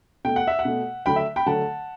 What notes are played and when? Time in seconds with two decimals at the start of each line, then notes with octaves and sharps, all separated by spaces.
0.24 B2 A3 G5
0.36 F#5
0.47 E5
0.59 F#5
0.65 B2 A3
1.06 D3 F#3 A3 G5 B5
1.16 E5
1.36 G5 B5
1.46 D3 F#3 A3 F#5 A5